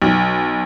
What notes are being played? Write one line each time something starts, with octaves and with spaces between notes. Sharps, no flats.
B1